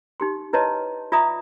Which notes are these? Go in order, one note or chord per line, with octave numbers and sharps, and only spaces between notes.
D#4 G4 C6
E4 B4 C#5 D#5 A5 C6
F4 D5 E5 A#5 D#6